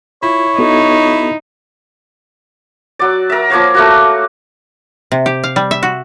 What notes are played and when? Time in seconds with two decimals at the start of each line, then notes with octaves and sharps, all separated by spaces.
0.23 E4 F4 C#5
0.59 B3 D#4 F#4 A4
2.99 F#3 D5
3.30 A#4 E5
3.50 F3 A#3 C#5 F5
3.75 A3 A#3 F#4
5.12 C3
5.26 G4
5.44 F5
5.56 G3
5.71 E5
5.83 F#4